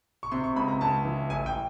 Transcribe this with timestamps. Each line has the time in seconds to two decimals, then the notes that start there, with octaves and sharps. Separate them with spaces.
0.23 C#6
0.32 C3 C6
0.44 C#6
0.56 C#2 B5
0.68 A#5
0.81 C#2 A5
1.05 E3
1.30 A1 G#5
1.46 G5